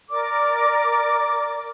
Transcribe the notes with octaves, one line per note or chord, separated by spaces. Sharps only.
A#4 D5 D6